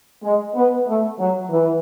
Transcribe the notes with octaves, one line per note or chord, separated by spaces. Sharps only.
G#3
B3
A3
F#3
E3